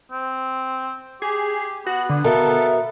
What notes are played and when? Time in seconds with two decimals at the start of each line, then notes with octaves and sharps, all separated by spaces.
0.12 C4
1.22 G4 G#4
1.86 B3 F#4
2.09 D3
2.24 B2 A4 A#4 E5 F5